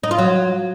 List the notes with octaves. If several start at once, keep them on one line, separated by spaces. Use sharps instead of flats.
D#4
F4
F#3